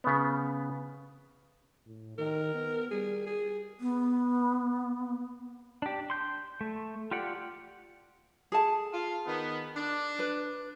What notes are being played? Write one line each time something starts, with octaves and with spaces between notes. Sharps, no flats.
C#3 B3
A2
D#3 A#4
B3
G3 G#4
G#4
B3
D4 G4
C6 G6
A3
F4 G4 D5 F#5
G#4 A4 A5
F4 F5
D#3 B3
D4
B4